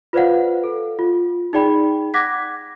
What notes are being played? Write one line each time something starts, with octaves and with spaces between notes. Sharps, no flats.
F4 B4 C5 D5 F5 F#5
A4
F4
D#4 G#4 D5 G5 B5
F#5 D6 F#6 G#6 A#6 B6